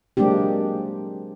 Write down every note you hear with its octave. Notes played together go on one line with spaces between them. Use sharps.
F#3 G#3 A#3 C4 D4 G4